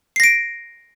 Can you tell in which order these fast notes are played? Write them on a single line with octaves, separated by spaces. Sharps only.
C7 A#6 D7